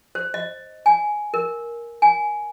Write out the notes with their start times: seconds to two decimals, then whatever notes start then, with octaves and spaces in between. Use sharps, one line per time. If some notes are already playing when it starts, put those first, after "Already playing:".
0.15 C5
0.34 D#5
0.86 G#5
1.34 A#4
2.02 G#5